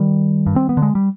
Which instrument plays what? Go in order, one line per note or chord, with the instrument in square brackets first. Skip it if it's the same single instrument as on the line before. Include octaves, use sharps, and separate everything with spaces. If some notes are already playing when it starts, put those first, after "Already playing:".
Already playing: [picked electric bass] D#3 G3
G2
C4
B3
D3
G#3
G3